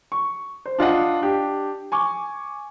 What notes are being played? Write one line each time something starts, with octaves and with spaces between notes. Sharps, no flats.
C#6
C5
D4 F4 D#5 F#5
D4 G4
G#5 C#6 D6